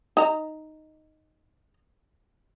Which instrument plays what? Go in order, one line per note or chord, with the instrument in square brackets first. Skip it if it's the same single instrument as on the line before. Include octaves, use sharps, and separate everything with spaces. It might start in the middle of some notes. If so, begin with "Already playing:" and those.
[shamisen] D#4 A#5